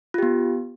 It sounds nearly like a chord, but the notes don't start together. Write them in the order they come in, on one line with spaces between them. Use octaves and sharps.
F4 G4 B3